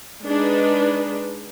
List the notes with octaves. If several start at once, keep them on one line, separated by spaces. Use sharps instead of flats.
G#3 D4 D#4 B4